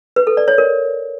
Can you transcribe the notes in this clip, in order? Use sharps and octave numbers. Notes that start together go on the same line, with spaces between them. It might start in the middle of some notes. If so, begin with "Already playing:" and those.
B4
A4
D5
C#5
A#4